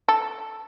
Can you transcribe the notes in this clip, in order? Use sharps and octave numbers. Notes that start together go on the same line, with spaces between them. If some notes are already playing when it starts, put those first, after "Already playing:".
A4